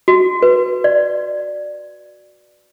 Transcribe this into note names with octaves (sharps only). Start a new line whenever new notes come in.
F#4
B4
D5